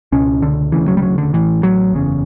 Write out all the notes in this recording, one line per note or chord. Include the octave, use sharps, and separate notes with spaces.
C#2 B2 C#4
D3
E1 D2 C#3 E3
F#3
G3
F#3
D3
A1 A2 E3
F#3
F#1 E2 C#3